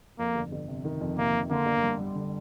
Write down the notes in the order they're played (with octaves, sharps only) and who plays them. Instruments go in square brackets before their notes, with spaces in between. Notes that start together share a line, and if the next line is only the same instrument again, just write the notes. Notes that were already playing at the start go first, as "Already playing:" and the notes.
[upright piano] F2 [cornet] A#3
[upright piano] G1
G1
C3
D#3
F2
[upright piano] C3 [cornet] A#3
[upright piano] C3
[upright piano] D3 [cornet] A#3
[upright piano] G1
G3
G3
D3